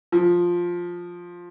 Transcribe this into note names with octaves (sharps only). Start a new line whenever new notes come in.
F3